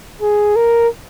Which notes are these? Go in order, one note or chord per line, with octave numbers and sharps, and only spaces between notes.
G#4
A#4